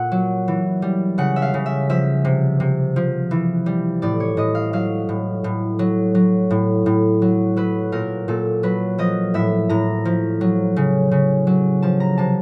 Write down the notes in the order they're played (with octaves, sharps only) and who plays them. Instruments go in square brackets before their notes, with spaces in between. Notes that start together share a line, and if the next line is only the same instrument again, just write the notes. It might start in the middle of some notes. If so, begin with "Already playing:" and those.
Already playing: [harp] A#2 F#5
F#3
E3
G3
C#3 F#5
E5
F5
C#3
E5
F3 E5
C3
C3
F3
E3
G3
A2 D5
C#5
A2 D#5
F5
F#3 F5
A2
A2
F#3
F#3
A2
A2
F#3
F#3 B4
A#2 A#4
A#2 A4
F#3 B4
F3 D#5
A2 E5
A2 A#5
F3
F#3
C#3
C#3
F#3
F3 A5
A#5
C3 A5